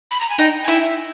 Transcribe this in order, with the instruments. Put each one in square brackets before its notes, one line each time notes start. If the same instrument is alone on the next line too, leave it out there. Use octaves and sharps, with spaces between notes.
[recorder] B5
A#5
G#5
[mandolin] D#4 [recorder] G5
[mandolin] E4 [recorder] G#5
[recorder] G5
E5